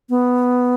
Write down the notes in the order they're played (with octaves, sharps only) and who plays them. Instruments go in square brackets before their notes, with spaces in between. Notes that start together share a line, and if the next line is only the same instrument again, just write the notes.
[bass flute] B3